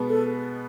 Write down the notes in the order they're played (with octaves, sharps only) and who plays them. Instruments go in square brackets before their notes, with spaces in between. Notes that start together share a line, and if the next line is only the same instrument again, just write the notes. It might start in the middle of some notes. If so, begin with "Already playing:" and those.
Already playing: [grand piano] B2 G#3 B3
[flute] A4